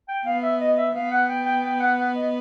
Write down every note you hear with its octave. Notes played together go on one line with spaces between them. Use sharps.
G5
B3 F5
E5
D#5
E5
B3 F5
F#5
G5
G5
G5
F#5
F#5
D#5